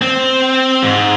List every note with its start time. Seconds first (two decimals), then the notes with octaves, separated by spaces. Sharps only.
0.02 C4
0.83 G#2